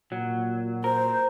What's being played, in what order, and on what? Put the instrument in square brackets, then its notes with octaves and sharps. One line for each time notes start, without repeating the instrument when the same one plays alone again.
[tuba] A#2 [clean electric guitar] F#3
[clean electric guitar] A#4 [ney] C5